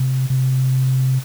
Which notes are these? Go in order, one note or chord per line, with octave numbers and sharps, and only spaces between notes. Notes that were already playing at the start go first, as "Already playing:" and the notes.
Already playing: C3
C3